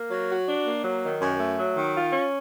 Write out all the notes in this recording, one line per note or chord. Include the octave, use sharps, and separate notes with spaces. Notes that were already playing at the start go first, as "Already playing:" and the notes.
Already playing: A#3
F#3
F#4
D4
A#3
F#3
D#3
F#2
A3
F#3
D#3
F4
C#4